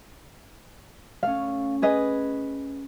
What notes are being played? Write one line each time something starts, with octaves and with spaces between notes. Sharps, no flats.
A3 C#4 F5
G#4 B4 D#5